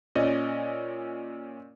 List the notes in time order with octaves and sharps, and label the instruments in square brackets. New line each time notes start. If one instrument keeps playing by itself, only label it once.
[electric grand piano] A#2 C#4 D5 D#5